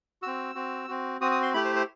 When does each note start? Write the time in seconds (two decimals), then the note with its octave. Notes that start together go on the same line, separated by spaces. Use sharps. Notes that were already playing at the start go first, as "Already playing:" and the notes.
0.22 C4 F#4 E6
0.55 C4 F#4
0.88 C4 F#4
1.21 C4 F#4 D#6
1.31 D#6
1.43 C6
1.54 A3 E4 G4 B5
1.65 C5
1.76 C5